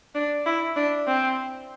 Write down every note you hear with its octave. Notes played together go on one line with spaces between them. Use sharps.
D4
E4
D4
C4